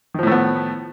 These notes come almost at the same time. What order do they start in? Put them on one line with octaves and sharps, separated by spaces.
D#3 F3 A2 A3 B3